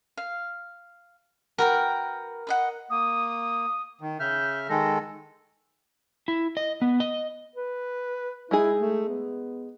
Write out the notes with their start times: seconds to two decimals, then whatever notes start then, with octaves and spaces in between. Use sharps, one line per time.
0.17 F5
1.58 F#4 A#4 B4 G5
2.47 B4 D#5 F#5
2.90 A#3 D#6
4.01 D#3
4.20 C#3 E5 F6 G6
4.69 D#3 G#3 A4 A#6
6.28 E4
6.57 D#5
6.82 B3
7.00 D#5
7.56 B4
8.51 G#3 D#4 E4 G#4
8.81 A3
9.09 B3